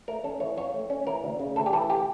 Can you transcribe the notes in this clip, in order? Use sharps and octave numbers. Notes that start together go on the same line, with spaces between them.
A3 A#4
C#4 A4
E3 C#5
F2 C#5
A3
C#4
E3 A#4
D2
C#3
D2 A4
G4
E3 A4
G4